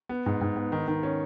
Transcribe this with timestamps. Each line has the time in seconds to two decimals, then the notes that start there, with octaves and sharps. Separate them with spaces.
0.09 B3
0.26 G#2
0.41 G#2
0.56 B3
0.72 D#3
0.88 D#3
1.03 C#4